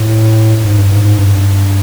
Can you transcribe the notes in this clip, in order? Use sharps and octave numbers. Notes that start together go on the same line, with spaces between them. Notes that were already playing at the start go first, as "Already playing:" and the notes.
Already playing: A2
G#2
G2
G#2
G#2
G2